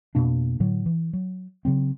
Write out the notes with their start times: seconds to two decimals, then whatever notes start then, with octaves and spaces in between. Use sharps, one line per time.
0.15 F2 B2 A#3 D4
0.60 A2 D3 F#3
0.86 E3
1.13 F#3
1.65 C#3 F#3 C4